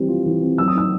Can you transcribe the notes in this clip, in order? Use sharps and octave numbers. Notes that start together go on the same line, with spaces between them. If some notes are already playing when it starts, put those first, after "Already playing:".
Already playing: E3 G3 C4
F4
E3
C4
F#3 E6
D#6
D#4 E6